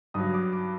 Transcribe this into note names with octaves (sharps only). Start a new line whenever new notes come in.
G2 F#3 D#6
D6
D6